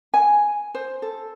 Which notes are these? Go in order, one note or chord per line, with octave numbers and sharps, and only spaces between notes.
G#5
C5
A4